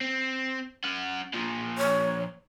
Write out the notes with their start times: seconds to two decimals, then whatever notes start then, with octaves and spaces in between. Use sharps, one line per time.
0.01 C4
0.84 C#4 F#5
1.33 A#2 F3
1.78 C#5